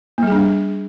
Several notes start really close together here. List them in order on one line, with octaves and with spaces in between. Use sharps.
A#3 G3 G#4 D4